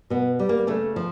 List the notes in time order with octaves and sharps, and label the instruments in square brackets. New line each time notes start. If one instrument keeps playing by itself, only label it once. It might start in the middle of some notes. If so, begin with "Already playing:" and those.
[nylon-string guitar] B2 B3
G3
A#3
C#3 A3
F3